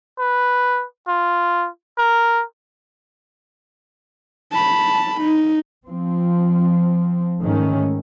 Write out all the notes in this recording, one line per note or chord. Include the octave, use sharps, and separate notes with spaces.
B4
F4
A#4
A5 B5
D#4
F3 C4
G#2 D#3 A3 C#4